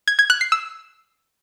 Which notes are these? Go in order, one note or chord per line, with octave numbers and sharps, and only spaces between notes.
G#6
G#6
F#6
C7
E6